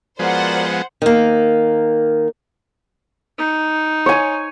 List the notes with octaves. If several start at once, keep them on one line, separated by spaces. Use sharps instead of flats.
F3 G#3 B3 F#4 A#4 C5 D5 F#5
D#3 A#3
D#4
C#5 G#5